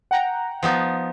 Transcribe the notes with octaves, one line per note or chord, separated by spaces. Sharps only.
F#5 G5 A#5
F3 B3 D#4